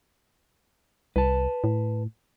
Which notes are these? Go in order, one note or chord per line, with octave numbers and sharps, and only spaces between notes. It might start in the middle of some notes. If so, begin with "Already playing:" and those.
C2 B4 A5
A2